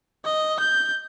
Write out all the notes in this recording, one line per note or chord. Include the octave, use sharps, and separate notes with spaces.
D#5
G6